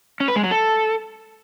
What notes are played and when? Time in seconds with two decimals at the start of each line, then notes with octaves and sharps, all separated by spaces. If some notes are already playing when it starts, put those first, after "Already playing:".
0.20 C#4
0.28 B4
0.36 G#3
0.43 F#3
0.51 A4